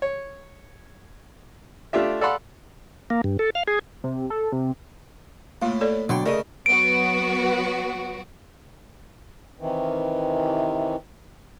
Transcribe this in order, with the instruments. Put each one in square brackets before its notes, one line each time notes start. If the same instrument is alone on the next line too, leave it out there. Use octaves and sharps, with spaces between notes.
[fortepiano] C#5
A3 D4 F4 G4 E5
A4 D5 F5 F#5 B5 C6
[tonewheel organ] A#3
G2
A4
F5
G#4
[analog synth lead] C3
A4
C3
[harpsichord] A2 [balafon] A3 A#3 F4
[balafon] A4 C#5 D5
[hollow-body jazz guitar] B2 D3 F#3 [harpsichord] D5 G5 [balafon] C6
[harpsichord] C#3 [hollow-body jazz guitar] A3 A#4 D#5 [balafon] D5
[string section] F#3 B3 F#4 [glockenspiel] D7
[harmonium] C3 D#3 E3